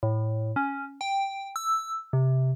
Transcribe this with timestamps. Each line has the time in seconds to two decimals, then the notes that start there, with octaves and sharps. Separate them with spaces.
0.03 A2
0.56 C#4
1.01 G5
1.56 E6
2.13 C3